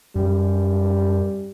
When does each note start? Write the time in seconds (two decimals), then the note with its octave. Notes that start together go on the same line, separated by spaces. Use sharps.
0.16 F#2 G3